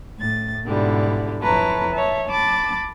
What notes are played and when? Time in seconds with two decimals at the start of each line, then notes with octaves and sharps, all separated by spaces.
0.18 A2 A6
0.66 G#2 B2 D3 G3 E4
1.42 F2 E4 B4 C#5 A5 A#5
1.92 C#5 E5 A5
2.27 A5 B5 D6 A6